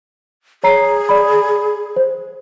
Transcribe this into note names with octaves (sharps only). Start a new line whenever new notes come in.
G#4 C#5 A#5 C7
D5 B5
C5